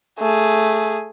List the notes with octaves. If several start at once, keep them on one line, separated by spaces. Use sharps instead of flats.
A3 G#4